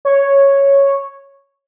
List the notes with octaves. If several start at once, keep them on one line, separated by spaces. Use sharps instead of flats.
C#5